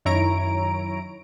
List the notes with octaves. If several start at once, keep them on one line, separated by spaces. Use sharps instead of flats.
F#2 D#3 E4 C#5 A#5 D7